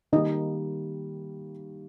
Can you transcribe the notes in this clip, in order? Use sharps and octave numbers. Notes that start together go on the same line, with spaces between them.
D#3 G3 A#3 D#4 D#5